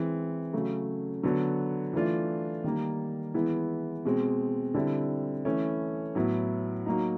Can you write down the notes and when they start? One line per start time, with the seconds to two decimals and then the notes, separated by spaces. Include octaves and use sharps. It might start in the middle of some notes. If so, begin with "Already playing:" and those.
Already playing: E3 G#3 C4
0.53 C#3 F#3 A3
1.23 D3 F#3 B3
1.93 E3 A3 D4 F4
2.64 D#3 G3 A#3
3.34 E3 G#3 B3 E4
4.05 B2 G#3 C4
4.74 D3 G3 C4 E4
5.45 E3 A3 C#4 E4
6.15 A2 F#3 B3 E4
6.86 F#3 A#3 D#4